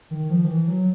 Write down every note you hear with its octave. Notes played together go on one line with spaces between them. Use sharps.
D#3
F3
D#3
E3
F#3